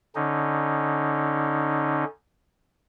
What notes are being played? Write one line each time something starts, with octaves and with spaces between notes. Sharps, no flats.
D3 C#4 D#4